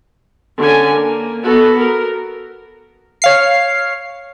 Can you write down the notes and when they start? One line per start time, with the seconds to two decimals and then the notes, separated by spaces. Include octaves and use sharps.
0.58 D3 C#4 D4 G#5
0.92 A#3
1.42 B3 F#4 A4
1.77 A#4
3.22 C#5 F5 C7